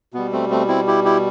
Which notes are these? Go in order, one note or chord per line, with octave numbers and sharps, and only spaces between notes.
B2 G3 B3
A3 C4
A3 C4
C4 E4
E4 G4
E4 G4